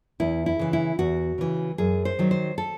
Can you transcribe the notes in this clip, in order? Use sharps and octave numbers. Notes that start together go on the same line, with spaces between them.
E2 E4
E4
C#3 E3
E4
E2 F#4
C#3 E3
F#2 G#4
C5
D#3 F#3
C5
A4